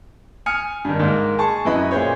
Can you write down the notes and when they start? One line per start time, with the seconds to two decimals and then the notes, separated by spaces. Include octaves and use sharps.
0.46 G#5 D#6 F6 C#7
0.85 G2 D#3
0.99 G#2 D#3 A#3
1.38 G#4 A5 C#6
1.65 F#2 B3 E4 D#5 B5
1.91 A#2 G#4 C5 C#5